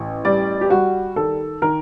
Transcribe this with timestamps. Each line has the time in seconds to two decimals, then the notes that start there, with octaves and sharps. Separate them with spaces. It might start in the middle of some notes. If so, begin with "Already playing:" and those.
Already playing: A1
0.25 G3 D5
0.61 G4
0.70 G3 F#4
1.16 D#3 A4
1.62 D#3 A#4